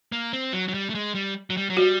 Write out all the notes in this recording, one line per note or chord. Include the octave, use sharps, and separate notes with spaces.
A#3
C4
F#3
F#3
G3
A3
G#3
G3
F#3
G3
F#3
G3 F#4